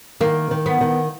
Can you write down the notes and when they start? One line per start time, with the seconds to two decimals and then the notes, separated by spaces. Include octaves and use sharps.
0.20 D#3 A#3
0.51 D#3
0.66 B3
0.81 D#3